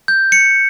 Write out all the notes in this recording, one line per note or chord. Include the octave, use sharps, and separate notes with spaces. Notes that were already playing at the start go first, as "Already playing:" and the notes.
G6
C#7